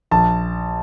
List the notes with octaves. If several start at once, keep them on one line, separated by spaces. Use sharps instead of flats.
A#1 A5